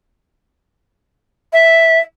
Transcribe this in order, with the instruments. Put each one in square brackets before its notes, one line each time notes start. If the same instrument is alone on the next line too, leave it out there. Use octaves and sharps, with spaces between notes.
[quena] E5